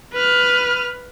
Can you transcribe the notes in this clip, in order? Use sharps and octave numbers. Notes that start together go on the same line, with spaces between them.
B4 F6